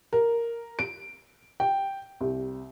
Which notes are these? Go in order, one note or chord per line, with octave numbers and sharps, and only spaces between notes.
A#4
D7
G5
C2